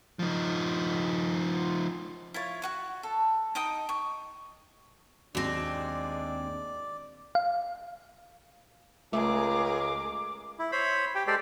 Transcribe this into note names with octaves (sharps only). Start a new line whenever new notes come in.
F3 D#4
E4 F4 C#5
F#4 F#5 C#6
A4
D#4 D#5 G5 D#6
C#6
D#2 G#3 C4 D4 F#4 D5 A#6
F5
C#2 A3 G#4 A#4 D6
E4
C5 C#5 B5
G4 G5
G#3 G4 A4 C5 D5 G5